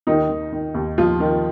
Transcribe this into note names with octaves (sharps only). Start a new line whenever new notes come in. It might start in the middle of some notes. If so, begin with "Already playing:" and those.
D#2 D#3 D#4
D#3
D#3
D#2
D#2 F3 F4
D#3